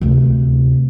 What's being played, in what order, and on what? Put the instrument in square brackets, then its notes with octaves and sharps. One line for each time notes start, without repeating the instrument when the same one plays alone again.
[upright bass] D2 C3